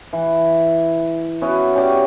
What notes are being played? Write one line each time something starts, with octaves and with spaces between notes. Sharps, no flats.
E3
B3 C#4 E4 F#4
C#4 G4 C#5 D5